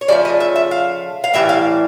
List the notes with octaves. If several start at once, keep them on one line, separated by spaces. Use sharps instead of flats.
C#5
C#3 F3 A3 D5
D#5
E5
E5
F5
F5
A2 E3 G3 E5
F5